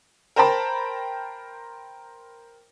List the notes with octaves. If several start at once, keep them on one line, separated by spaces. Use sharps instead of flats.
A#4 C5 G5 A5 B5